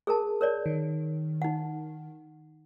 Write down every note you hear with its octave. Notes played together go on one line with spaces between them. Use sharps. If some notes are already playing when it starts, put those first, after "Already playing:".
G#4 A#4 A5
A#4 C#5 D5
D#3
D#4 F#5